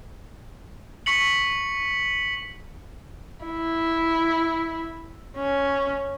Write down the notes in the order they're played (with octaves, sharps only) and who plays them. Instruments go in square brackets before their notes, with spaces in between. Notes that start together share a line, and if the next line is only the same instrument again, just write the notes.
[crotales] C#6 B6 C#7 F#7
[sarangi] E4
C#4